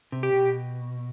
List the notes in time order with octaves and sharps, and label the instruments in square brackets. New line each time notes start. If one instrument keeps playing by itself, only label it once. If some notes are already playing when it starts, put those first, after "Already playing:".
[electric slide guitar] C3
[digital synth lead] G4
[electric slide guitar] B2